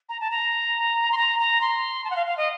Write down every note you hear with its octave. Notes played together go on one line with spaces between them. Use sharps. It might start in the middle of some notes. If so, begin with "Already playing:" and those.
A#5
A5
A#5
C6
A#5
A#5
C6
A5
F#5
F5
F5
D#5